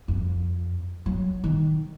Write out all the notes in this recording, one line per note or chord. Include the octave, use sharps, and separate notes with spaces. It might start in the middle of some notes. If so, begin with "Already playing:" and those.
F2
F#3
D#3